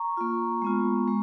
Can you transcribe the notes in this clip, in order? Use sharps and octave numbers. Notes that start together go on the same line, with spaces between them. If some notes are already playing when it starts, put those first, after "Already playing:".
Already playing: A#5 C#6
A#3 F4
G#3 B3 F4
G#3